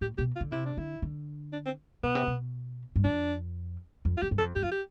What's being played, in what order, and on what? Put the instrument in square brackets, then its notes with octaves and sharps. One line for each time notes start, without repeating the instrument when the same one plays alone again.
[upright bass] A2 [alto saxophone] G4
[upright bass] B2 [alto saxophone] G4
[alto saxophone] F4
[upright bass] D3
[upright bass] C3 [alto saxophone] E4
[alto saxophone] D4
[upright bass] D3 [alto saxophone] E4
[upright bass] D3
[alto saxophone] D4
C4
[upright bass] B2 [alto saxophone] B3
[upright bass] C3
B2
G2
[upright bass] F2 [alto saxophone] D4
[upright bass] F2
[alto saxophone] F4
[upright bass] E2 [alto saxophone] G4
[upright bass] G2
[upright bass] F2 [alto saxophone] A4
[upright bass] G2 [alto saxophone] G4
[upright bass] F2 [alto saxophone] F4
[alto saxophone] G4